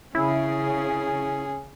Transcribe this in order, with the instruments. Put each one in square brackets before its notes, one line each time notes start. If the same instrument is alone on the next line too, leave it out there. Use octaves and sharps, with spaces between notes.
[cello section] C#3 [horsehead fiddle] C#4 G#4 [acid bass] E4